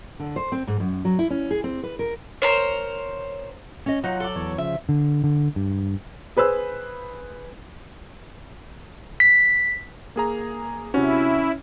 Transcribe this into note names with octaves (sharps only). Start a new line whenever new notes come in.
D3
C5
C4
G#2
F#2
F#3
E4
C#4
G#4
C4
B4
A#4
A#4 C5 C#5
C#4 D#5
F#3 D#4 F4 F#5
A4 D5
E2 C#5
C#3 F3 E5
D3
D3
G2
G#4 B4 C5 E6
B6
A#3 G#4 A#5
C3 C#4 E4 F#4